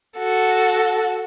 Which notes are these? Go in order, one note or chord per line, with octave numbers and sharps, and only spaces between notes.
F#4 A4